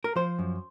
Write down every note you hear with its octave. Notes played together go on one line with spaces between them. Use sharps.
A#4
F3 C5
F#2